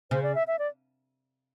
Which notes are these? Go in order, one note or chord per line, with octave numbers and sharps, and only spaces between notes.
C#3 C5
D5
E5
E5
D5